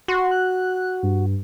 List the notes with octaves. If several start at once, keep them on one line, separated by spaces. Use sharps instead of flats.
F#4 C6
F#6
G2